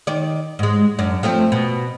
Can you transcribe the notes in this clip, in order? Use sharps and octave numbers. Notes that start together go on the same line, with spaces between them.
D#3 D5
G#2 G#3
F#2 D4
F3 A3 C4
B2